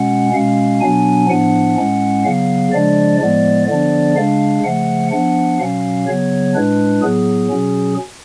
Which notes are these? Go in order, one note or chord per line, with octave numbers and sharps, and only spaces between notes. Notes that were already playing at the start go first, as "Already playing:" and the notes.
Already playing: B2 G#3 C#4 F#5
B2 G#3 C#4 F5
B2 F#3 B3 D4 G#5
A2 F3 B3 D4 F#5
A2 G#3 C#4
C#3 F#3 B3 F5
C#3 F3 G#3 D4 D5
A2 F3 G#3 B3 D5
D3 F3 B3 D4 D5
C#3 G#3 D4 F5
C#3 F3 A3 F#5
F3 B3 D4 F#5
B2 F#3 C#4 F5
C#3 F#3 B3 C#5
A2 G#3 D4 B4
A2 F#3 B3 G#4
B2 F#3 C#4